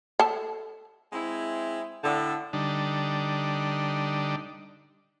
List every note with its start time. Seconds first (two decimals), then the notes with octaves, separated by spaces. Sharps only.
0.20 A4 A5
1.13 G#3 C4 E4
2.04 A2 D3
2.53 D3 G3 D4 D#4